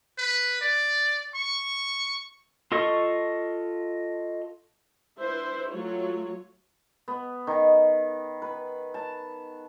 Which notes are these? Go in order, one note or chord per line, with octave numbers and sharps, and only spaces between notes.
B4
D5
C#6
F4 A4 D#5 C#6
D4 E4 B4 C5 E5
F#3 A3 F4 F#4 C#5
B3
D#3
B4
A5